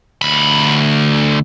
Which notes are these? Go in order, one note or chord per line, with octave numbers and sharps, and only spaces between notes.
D2 B5